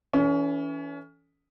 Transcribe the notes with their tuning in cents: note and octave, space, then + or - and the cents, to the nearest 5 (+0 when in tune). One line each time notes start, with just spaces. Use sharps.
E3 +0 C#4 +30 A4 +0